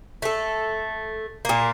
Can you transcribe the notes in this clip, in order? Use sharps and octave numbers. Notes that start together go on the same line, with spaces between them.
A3 A4
A#2 A#3